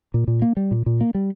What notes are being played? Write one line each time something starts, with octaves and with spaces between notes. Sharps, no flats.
A#2
A#2
A#3
G3
A#2
A#2
A#3
G3